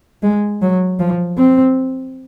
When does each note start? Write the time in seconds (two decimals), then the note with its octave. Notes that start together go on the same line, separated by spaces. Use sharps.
0.23 G#3
0.62 F#3
0.99 F3
1.38 C4